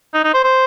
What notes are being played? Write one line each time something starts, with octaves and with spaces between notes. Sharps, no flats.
D#4
D#4
C5
C5